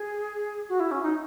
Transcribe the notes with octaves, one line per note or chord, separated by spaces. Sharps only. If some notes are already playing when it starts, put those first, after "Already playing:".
Already playing: G#4
F#4
E4
C#4
D#4